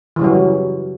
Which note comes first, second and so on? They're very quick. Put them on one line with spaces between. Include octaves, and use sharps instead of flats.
E3 C#3 G3 F#3